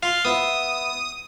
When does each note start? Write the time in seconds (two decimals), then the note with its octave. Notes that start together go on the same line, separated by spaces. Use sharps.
0.03 F4 F5 C6
0.25 B3 E4 D#6